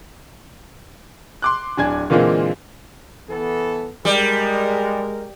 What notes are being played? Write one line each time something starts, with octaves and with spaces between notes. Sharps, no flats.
C6 D6 F#6
D1 D4 G#5 G#6
A#2 D3 E3 G#3 A#3 C4
E3 B3 A4
G3 G#3 A#4